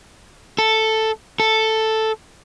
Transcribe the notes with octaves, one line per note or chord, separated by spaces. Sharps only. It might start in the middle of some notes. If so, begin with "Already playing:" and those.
A4
A4